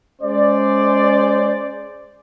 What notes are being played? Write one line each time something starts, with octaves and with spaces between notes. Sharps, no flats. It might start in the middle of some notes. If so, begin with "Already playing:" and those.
G#3 C#4 G#4 C5 D5